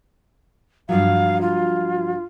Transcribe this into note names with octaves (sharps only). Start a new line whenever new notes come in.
G2 F3 F#3 F5
F4